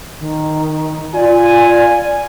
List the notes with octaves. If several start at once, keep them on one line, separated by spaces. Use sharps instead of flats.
D#3
F4 D5 G#5